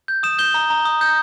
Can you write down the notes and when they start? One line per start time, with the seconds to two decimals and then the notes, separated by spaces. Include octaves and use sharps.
0.08 G6
0.23 D#6 E7
0.39 G6 G7
0.54 A#5
0.70 A#5
0.85 D#6
1.01 G6